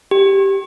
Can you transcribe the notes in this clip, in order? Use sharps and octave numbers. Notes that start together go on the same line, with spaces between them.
G4